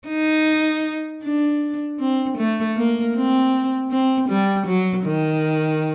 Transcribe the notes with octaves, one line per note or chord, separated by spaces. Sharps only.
D#4
D4
C4
A3
A#3
C4
C4
G3
F#3
D#3